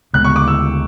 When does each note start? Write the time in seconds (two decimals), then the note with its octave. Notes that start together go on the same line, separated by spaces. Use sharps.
0.13 D2 C#3 G#3 B3 F#6
0.24 C#6
0.36 D6
0.48 E6